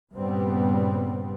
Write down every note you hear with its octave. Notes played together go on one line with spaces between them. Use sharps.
G2 A#2 C#3 G3 B3 C4